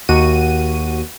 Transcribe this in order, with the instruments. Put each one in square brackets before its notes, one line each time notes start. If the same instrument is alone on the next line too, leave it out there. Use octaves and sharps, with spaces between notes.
[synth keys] D#2 F#4 D#7